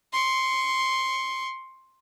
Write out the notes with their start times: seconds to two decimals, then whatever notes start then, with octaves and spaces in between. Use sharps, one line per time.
0.13 C6 C#6